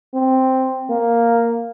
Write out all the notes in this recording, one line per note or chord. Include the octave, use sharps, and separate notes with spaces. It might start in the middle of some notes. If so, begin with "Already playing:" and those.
C4
A#3